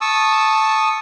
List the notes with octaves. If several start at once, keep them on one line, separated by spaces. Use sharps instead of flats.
A5 C#6 D#6 E6